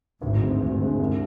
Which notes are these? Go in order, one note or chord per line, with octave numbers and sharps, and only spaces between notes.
G#1 D2 G#2
D3 G#3 C4
D2 G2
D3 G#3 C4
C2